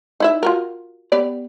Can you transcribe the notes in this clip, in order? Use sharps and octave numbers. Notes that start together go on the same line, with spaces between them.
D#4 E4 E5
F4 F#4 A#4
B3 G4 D5